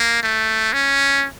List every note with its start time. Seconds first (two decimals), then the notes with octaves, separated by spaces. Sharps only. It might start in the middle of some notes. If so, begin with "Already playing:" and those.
Already playing: A#3
0.23 A3
0.73 C#4